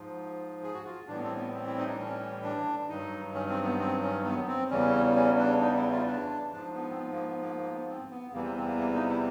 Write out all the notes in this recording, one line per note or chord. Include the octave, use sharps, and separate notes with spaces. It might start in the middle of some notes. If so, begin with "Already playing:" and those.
Already playing: G#2 F3
G#4
F#4
F4
A2 E3 G3 D4
B3
C4
B3
C4
E4
D#4
D4
C#4
D4
G2 D#3 F#3 D#4
C#4
C4
B3
C4
C#4
B3
C4
E2 C#3 E3 G3 C#4
C#4
D4
D#4
E4
F4
D4
G#2 F3 D4
B3
C4
B3
A#3
B3
A#3
A#3
B3
C4
B3
E2 C3 E3 G3 A#3
C4
C4
A#3
A#3
D#4
E4